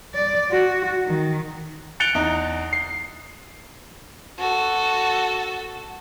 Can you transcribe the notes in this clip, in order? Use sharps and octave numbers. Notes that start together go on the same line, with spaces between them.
D5
F#4
D#3
F#6 A6 C#7 D7 F7 G7
E2 D#4
C7
F#4 A4